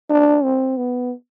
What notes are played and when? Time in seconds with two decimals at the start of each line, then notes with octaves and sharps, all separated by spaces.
0.10 D4
0.43 C4
0.77 B3